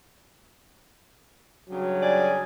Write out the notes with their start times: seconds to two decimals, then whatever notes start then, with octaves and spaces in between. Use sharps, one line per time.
1.69 G2 C#3 F#3
2.02 D5 G#5